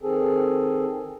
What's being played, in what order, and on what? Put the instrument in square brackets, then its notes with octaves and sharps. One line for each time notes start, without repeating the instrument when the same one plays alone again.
[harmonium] D#3 C4 G#4 A4